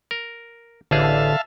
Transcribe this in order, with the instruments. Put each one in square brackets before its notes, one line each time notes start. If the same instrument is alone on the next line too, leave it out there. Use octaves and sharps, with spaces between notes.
[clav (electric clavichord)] A#4
[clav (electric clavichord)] A1 G#4 [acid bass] D3 [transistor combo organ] E5 F5 A5